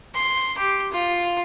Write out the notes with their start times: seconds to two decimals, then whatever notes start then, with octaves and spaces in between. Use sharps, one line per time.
0.15 C6
0.58 G4
0.92 F4